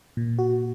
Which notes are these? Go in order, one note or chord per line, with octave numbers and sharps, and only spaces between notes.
A#2
F#4